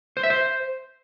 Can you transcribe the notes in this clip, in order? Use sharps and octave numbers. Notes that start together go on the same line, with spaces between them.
C5
E5
C5